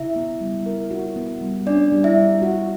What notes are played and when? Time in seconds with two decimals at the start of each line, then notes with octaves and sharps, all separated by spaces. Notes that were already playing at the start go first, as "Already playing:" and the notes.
Already playing: C#3 E4 E5
0.16 B3
0.41 G3
0.66 A#4
0.91 F#4
1.16 B3
1.41 G3
1.67 C#4 D4 D5
1.92 G3
2.04 E4 E5
2.17 G3
2.42 F#4